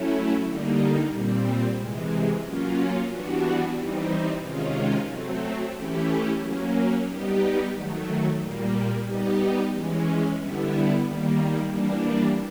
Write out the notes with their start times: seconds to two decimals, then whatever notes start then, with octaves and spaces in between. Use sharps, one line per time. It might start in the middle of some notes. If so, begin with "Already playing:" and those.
Already playing: F#3 A3 C#4 E4
0.44 D3 G3 A#3 D#4
1.10 A#2 G3 C4
1.76 C3 E3 G#3
2.43 F#3 A#3 C#4 F4
3.09 E3 G3 B3 D4 F#4
3.75 E3 G3 C4 D#4
4.41 C3 D#3 G#3 C#4 F4
5.07 F#3 A3 C4
5.73 E3 A3 C#4 E4 G4
6.40 F#3 A#3 C#4
7.06 G3 B3 D#4 G4
7.73 D#3 F#3 A3
8.39 A#2 G3 A#3
9.05 G3 B3 D#4 G4
9.71 E3 G#3 C#4
10.37 D3 G3 B3 E4
11.04 D#3 G3 A#3
11.70 E3 G3 A#3 D4